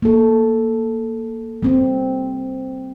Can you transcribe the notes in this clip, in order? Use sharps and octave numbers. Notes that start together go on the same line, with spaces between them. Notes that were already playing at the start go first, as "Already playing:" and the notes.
A#3 A4
G3 C4